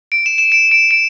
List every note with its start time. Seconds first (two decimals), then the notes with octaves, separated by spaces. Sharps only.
0.12 D7
0.26 E7
0.38 E7
0.52 D7
0.71 D7
0.91 D7